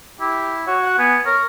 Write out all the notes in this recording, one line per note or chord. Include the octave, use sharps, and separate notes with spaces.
E4 G4
F#4 C#5
F#5
B3 G#5
A#4 C#5